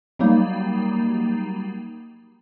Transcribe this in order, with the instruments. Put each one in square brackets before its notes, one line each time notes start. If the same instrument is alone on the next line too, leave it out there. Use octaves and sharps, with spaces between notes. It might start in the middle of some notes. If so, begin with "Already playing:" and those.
[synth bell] F#3 G3 A#3 D#4